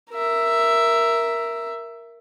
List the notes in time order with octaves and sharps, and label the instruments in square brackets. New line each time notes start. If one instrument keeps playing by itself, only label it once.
[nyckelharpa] A#4 E5